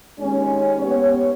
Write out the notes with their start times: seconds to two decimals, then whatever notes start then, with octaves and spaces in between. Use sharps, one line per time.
0.20 D#2 G#3 C#4
0.82 B3 G4 C#5